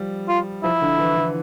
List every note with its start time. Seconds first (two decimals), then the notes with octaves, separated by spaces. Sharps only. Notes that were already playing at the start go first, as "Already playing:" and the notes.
Already playing: F3 G3
0.28 F4
0.63 F3 E4
0.82 D3
0.99 E3
1.17 D3